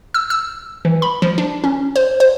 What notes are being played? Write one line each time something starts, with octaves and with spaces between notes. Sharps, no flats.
E6
E6
E3
B5
F3
D4
C#4
C5
C5